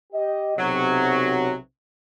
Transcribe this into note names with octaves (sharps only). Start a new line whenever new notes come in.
G4 D#5
B1 C3 F#3